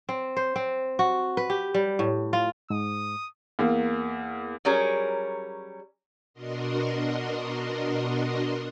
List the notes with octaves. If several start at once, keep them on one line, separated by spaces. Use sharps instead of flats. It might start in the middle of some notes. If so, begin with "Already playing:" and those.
C4
C5
C4
F#4
B4
G4
G3
A2
F4
G#2 D#6
E2 A#3
F#3 G3 C#4 G#4 A#4
B2 D4 F#4 A#4 D#5 C6